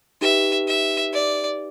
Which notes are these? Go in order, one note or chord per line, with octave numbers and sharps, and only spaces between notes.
D#4 G4 B4 E5
E5
D5